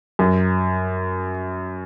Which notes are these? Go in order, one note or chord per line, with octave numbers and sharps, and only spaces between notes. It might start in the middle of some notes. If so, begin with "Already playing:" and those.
F#2